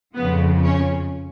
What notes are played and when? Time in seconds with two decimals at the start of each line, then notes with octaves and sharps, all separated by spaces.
0.15 F2 C#3 F3 B3
0.64 C#4